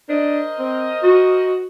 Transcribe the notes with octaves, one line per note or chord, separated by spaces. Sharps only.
D4 A#4 C5 D#5
C4
F#4